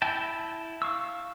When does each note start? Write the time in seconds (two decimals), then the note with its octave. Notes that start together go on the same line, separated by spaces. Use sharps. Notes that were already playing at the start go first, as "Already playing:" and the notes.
0.02 E4 G5 A5
0.82 F5 C#6 E6